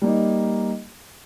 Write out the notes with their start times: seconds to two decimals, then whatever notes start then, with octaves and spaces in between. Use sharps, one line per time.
0.02 G3 A#3 D#4